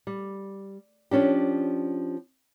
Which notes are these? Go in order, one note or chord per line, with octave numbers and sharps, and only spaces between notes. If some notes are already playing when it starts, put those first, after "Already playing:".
G3
F3 C#4 D4 G4